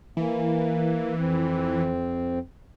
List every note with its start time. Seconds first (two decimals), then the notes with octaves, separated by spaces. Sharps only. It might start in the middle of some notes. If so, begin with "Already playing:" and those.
0.17 E3 A#3
1.17 F2 C4